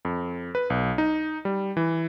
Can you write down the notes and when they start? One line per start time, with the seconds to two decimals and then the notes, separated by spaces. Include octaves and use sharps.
0.05 F2
0.55 B4
0.70 B1
0.98 D#4
1.45 G3
1.77 E3